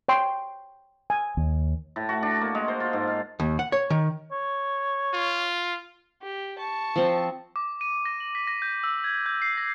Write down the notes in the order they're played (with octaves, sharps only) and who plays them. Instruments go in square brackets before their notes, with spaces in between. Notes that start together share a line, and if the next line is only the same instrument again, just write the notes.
[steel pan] C#5 G5 C6
G#5
[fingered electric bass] D#2
[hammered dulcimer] A2
F#4
D4
A#3
G#3
C5
F4
G#2
F5
[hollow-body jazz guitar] D#2
F#5
C#5
D#3
[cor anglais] C#5
[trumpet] F4
[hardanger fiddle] G4
A5 C#6
[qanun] F3 C4
[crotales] D6
D#7
A#6
F#7
B6
A#6
G6
E6
G#6
G6
C7
A#6